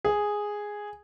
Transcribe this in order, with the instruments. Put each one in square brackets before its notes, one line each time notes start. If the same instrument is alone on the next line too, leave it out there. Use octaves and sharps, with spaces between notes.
[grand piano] G#4